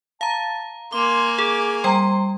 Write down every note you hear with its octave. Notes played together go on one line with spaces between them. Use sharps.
F5 A5 A#5
A#3 G#5 C6 D6
G#4 D6
G3 G5 A#5 C6